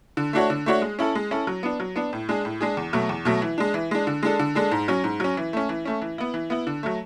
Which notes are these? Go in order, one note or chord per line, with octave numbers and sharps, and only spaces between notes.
D3
A3 D4 F#4 C#5
D3
A3 D4 F#4 C#5
G#3
C#4 E4 A4
G#3
C#4 E4 A4
F#3
B3 D4
F#3
B3 D4
A2
G#3 D4 G#4
A2
G#3 D4 G#4
E2
B2 F#3 A3
E2
B2 F#3 A3
E3
G#3 D4
E3
G#3 D4
D3
G#3 D4 A4
D3
G#3 D4 A4
G#2
F#3 C#4
G#2
F#3 C#4
E3
A3 C#4
E3
A3 C#4
E3
B3 E4
E3
B3 E4
D3
F#3 A3